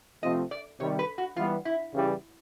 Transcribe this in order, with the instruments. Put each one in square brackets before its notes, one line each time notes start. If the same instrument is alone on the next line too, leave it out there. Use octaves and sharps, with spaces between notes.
[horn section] C3 F3 A3 C4 F4 [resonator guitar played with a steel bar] D#5
[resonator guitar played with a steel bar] D5
[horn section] C3 D#3 G3 [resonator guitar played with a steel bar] C#5
[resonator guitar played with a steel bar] B4
F#4
[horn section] E3 G3 B3 [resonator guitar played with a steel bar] F4
[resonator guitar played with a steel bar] E4
[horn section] C#3 E3 G3